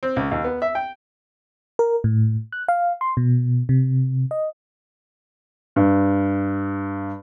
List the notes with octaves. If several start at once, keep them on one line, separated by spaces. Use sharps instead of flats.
C4
C#2
D#2
B3
E5
G5
A#4
A2
F#6
F5
C6
B2
C3
D#5
G2